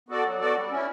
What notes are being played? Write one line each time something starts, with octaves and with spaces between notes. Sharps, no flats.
B3 F#4 A4 D5
F#3
B3 F#4 A4 D5
G3
C#4 E4